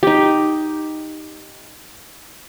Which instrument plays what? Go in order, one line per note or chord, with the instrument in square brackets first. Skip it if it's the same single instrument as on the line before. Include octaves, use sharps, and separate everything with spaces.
[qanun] D#4 G4